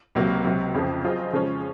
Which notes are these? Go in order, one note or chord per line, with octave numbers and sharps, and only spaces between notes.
C#2 C3 F#3 A#3
C#2 C3 F#3
F2 C#3 F3
F#3 C4 F4 G#4 D#5
C#3 F3 G#3 C#4